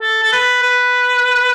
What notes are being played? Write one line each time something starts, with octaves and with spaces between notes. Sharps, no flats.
A4
A4
B4
B4